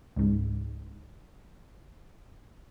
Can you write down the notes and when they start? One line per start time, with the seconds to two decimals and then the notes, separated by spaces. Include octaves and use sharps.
0.16 C#2 G#2